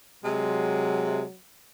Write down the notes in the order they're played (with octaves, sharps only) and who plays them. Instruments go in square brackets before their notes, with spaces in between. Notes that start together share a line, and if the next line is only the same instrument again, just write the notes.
[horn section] C3 G#3 [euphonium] F#3